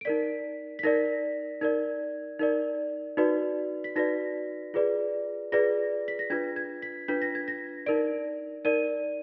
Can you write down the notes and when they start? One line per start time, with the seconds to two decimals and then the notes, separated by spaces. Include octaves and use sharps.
0.01 D7
0.05 D#4 A#4 D5 B6
0.79 B6
0.83 D#4 A#4 D5 A#6
1.61 D#4 A#4 D5 G#6
2.39 D#4 A#4 D5
3.17 D#4 F#4 B4 D5
3.84 B6
3.96 D#4 F#4 B4 D5 A#6
4.74 F4 G#4 B4 D5
5.52 F4 G#4 B4 D5 A#6
6.08 B6
6.19 A#6
6.30 D4 F4 B4 G#6
6.56 G#6
6.82 B6
7.08 D4 F4 B4 B6
7.22 A#6
7.35 G#6
7.48 A#6
7.86 D#4 A#4 D5 D7
8.65 D#4 A#4 D5 D#7